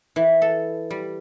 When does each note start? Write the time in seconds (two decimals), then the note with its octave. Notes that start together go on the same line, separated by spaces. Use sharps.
0.16 E3
0.42 A4
0.91 G3